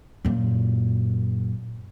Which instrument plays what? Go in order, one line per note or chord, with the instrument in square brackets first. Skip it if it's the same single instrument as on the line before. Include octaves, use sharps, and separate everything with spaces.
[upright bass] F#2 A#2